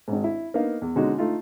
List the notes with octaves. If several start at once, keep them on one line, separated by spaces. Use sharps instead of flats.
G#1 G#2
E4
A#3 B3 D#4 F5
E2
B2 D3 G#3 C#4 D#4 F#4
A3 D#4 F4